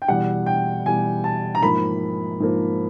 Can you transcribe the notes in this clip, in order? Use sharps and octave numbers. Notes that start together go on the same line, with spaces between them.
G5
E2 B2 G3 F#5
G5
E2 B2 G3 G#5
A5
A#5
G#2 F3 A#3 B5
G#2 F3 A#3